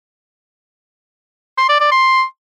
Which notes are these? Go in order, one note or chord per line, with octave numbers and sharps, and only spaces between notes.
C6
D5
D5
C6